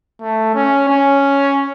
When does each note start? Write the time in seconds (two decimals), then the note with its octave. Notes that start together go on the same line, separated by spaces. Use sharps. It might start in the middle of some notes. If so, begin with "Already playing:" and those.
0.22 A3
0.55 C#4
0.88 C#4